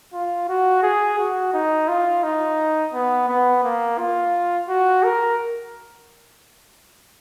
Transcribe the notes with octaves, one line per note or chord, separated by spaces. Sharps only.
F4
F#4
G#4
F#4
D#4
F4
D#4
B3
B3
A#3
F4
F#4
A#4